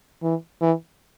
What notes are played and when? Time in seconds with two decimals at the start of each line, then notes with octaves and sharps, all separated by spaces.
0.23 E3
0.61 E3